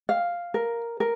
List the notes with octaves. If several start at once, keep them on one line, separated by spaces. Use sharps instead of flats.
F5
A#4
A#4